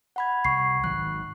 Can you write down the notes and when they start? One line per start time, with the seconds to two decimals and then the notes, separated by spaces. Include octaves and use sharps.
0.16 F#5 B5 G#6
0.45 C2 C#6 C7
0.84 G#1 D#3 F#3 F#6